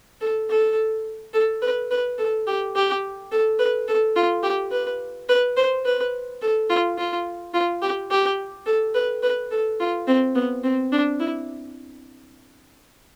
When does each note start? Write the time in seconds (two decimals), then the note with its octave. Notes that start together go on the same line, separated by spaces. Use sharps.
0.21 A4
0.50 A4
1.33 A4
1.62 B4
1.91 B4
2.18 A4
2.47 G4
2.76 G4
3.32 A4
3.59 B4
3.88 A4
4.16 F4
4.43 G4
4.72 B4
5.29 B4
5.57 C5
5.85 B4
6.42 A4
6.69 F4
6.98 F4
7.54 F4
7.82 G4
8.11 G4
8.66 A4
8.95 B4
9.23 B4
9.51 A4
9.80 F4
10.07 C4
10.35 B3
10.63 C4
10.92 D4
11.20 E4